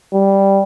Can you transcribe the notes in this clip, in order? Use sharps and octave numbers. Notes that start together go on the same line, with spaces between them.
G3